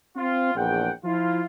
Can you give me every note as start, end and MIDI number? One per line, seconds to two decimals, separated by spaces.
0.16 0.52 60
0.16 0.52 65
0.55 0.89 34
0.55 0.89 40
0.55 0.89 78
0.55 0.89 79
1.04 1.44 53
1.04 1.44 64
1.04 1.44 65